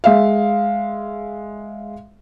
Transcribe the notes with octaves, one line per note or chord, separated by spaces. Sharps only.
G#3 E5 F5